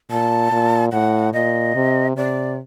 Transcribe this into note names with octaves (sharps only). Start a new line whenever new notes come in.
A#2 A5
A#2
A2 F#5
A#2 D#5
C3
C3 D5